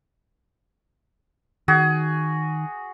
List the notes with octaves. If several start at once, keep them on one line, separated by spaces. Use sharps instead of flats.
D#3 F#4 G#4